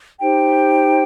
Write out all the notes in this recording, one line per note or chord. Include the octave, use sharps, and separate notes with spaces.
D#4 G4 C5 G5